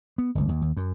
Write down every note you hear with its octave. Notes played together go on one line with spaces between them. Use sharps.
B3
G1 C#2
D#2
D#2
F#2